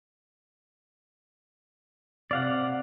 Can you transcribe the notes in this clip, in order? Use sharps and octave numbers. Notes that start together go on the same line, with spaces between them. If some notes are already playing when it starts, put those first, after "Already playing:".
C3 D5 F5 F#5